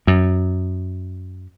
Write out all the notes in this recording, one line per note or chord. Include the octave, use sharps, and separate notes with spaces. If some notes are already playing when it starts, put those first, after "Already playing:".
F#2